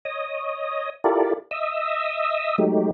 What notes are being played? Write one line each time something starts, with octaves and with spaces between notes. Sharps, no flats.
C#5 D#5 D#6
E4 F4 G4 A4 A#4 D5
D#5 E5 D#6 E6
F#3 G#3 A3 D#4 G4